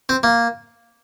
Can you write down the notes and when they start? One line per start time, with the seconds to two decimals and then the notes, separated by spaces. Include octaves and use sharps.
0.09 C4
0.23 A#3